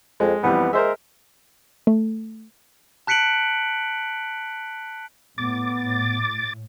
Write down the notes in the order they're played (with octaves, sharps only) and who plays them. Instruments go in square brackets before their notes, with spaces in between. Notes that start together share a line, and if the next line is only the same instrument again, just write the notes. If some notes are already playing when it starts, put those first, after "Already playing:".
[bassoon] F2 [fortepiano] G#3
[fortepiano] F2 E3 G3 [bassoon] B3
[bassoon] G#3 [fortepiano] A#4 C5 E5
[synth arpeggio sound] A3
[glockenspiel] A5 F#6 B6 C#7 D7 F#7
[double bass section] A2 [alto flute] B3 [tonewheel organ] D6 A6